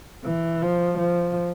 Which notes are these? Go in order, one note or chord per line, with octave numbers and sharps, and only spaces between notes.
E3
F3
F3